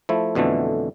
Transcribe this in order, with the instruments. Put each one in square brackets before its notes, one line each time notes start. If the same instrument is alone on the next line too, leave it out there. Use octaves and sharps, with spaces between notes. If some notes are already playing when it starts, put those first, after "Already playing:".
[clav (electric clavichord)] F3 A3 E4
F2 B2 D3 E3 A3